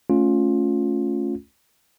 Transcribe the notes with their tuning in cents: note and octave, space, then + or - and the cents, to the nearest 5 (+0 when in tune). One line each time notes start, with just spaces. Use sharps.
A3 -15 C#4 +0 F4 +15